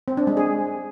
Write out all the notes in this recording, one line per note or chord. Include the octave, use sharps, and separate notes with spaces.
C4
D4
G#3
G#4